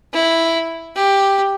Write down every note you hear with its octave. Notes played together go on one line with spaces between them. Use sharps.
E4
G4